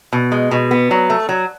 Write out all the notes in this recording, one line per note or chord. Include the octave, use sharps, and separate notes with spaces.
B2
G#3
B2
B3
F#3
A3
F#3